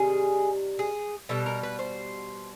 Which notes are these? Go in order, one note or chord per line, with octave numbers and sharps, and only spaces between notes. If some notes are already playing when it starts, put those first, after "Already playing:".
Already playing: C3 D#3 G3 G#4
G#4
B2 G3 A4
A#4
B4
C5